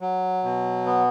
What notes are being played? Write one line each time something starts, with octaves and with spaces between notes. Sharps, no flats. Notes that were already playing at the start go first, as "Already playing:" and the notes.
F#3
B2
B3